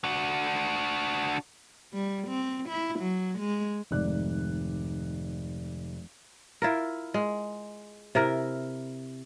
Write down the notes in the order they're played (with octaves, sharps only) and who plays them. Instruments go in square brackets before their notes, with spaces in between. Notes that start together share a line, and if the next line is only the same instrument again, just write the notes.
[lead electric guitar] D4 F#4
[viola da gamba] G3
C4
E4
F#3
G#3
[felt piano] F1 G#2 D#3 D5 F#6
[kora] E4 F4 A#4
G#3
C3 E4 A#4